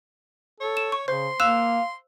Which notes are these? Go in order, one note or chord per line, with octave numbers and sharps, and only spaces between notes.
A4 C#5
E7
C#6
C#3 C5 C6
A#3 F5 E6 F#6 E7